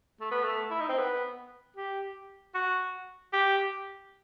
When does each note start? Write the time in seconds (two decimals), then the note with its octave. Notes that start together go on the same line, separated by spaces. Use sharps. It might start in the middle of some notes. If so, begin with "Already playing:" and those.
0.21 A3
0.31 B3
0.43 A3
0.70 E4
0.80 D#4
0.89 C4
0.98 B3
1.76 G4
2.54 F#4
3.33 G4